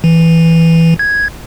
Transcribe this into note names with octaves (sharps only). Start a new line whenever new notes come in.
E3
G#6